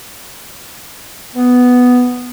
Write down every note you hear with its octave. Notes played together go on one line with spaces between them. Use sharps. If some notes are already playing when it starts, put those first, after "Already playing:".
B3